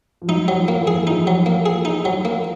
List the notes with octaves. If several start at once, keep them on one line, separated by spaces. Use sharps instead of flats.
F3
F#3 D#4
F#3
F3
A#3
E3
G#4
F3 D#4
F#3
A#3
G#4
D#4
F#3
A#3